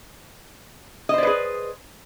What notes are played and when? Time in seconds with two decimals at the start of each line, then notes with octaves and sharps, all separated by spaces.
1.09 D#5
1.14 C5
1.18 D5
1.23 B4
1.27 G#4